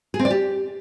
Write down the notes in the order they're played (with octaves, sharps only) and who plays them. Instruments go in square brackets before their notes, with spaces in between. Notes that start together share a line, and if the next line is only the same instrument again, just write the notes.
[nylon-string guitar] G#4
C4
D5
G4